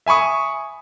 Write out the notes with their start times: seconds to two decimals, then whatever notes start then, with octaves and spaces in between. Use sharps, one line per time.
0.06 E5 G#5 B5 C#6 D#6